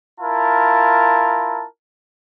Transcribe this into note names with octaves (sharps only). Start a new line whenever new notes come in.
E4 F4 A#4 A5